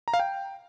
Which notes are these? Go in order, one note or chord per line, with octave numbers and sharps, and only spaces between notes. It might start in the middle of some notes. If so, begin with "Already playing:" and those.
A#5
F5
G5